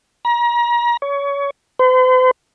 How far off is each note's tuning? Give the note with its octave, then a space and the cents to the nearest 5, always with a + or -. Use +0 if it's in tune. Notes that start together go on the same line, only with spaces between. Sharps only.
A#5 +35
C#5 +25
C5 -45